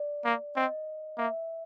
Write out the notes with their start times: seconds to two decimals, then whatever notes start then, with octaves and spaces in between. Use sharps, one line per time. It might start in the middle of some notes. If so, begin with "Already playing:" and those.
Already playing: D5
0.25 A#3
0.56 C4 D#5
1.18 A#3 E5